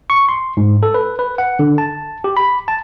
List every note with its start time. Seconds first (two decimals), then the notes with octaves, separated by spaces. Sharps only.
0.10 C#6
0.29 C6
0.57 G#2
0.83 A4
0.94 B4
1.19 B4
1.38 F#5
1.59 D3
1.78 A5
2.24 G4
2.37 B5
2.68 A5